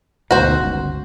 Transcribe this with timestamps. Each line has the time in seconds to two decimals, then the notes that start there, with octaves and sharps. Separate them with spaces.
0.31 D2 G#2 B2 F#4 C5
0.61 G1 C#2